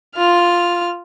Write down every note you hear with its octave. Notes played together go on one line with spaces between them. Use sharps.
F4 F6